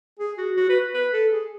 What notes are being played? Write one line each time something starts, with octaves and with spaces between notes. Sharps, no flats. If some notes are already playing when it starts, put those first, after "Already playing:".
G#4
F#4
F#4
B4
B4
A4
G#4